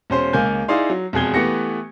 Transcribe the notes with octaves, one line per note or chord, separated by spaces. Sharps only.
E1 C#4 C5 C6
C#2 A#3 A#4 G#5 G6
D#4 E4 G#4 D5 F5 C6
F#3
E1 F2 G#4 G#6 G7
E3 A3 B3 G4 A#6 C#7